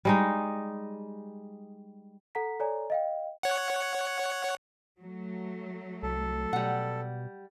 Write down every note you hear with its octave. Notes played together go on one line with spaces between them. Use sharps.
G3 G#3 D#4
A4 F#5 A#5 B6
A4 C#5 D5 G#5 A#5
D#5 F5 G5
C#5 F#5
F#3 A3
C2 A4
B2 G3 F#5